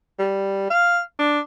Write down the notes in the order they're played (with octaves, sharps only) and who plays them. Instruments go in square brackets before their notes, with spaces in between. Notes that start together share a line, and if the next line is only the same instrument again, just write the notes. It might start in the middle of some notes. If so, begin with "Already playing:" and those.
[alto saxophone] G3
F5
D4